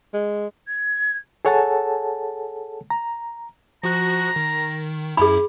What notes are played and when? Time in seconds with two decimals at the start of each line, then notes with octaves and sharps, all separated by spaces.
0.14 G#3
0.68 G#6
1.45 G#4 A4 C#5 F#5 G#5 A5
2.90 A#5
3.83 F3 F#4 A#5 F#6
4.36 D#3
5.17 F#2 E4 G#4 B5